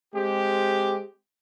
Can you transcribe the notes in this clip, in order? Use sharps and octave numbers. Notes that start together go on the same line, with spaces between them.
G#3 C4 G4